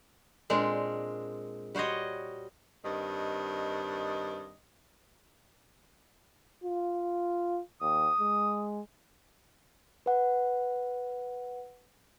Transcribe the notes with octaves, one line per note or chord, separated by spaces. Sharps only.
A#2 G#3 C4 D4 A#4
G3 F#4 C5 C#5 D#5
G2 D#3 C4 D#5
F4
D#2 D#6
G#3
B4 F#5